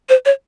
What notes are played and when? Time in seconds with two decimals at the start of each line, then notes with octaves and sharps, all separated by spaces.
0.09 C5
0.26 C#5